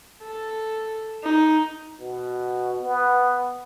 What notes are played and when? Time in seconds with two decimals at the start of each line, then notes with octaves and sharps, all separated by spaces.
0.23 A4
1.23 D#4
2.00 B2
2.81 B3